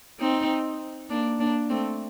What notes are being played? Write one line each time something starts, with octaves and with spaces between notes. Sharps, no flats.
C4 D#4
A#3 D4
A#3 D4
A3 C4